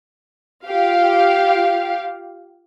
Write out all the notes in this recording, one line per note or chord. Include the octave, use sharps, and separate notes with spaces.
F4 G4 F5